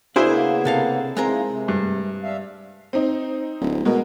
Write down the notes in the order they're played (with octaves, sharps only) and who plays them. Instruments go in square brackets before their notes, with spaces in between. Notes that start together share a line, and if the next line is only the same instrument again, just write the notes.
[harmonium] C#3 A#3 B3 [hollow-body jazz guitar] D4 [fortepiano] E4 G#4 C5
[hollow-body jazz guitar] C3 A4 F5
[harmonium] E3 A#3 D#4 [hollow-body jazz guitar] G#3 C4 A#4
[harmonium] C3
[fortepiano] G2
[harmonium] D4 E5 F5
[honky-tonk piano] C4 D#4
[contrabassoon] D1
[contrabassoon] B2 [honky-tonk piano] G#3 A#4